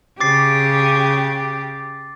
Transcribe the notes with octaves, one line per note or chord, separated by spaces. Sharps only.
C#3 G4 D6 A6 C7